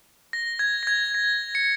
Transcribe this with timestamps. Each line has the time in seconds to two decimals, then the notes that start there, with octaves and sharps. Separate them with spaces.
0.33 A#6
0.59 G#6
0.83 A#6
0.87 G#6
1.14 A#6
1.55 C#7